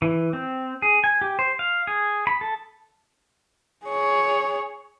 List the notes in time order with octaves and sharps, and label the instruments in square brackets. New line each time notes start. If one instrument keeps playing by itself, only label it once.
[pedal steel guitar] E3
C4
G#4
G#5
G4
C5
F5
G#4
B5
A4
[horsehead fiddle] G#4 C#5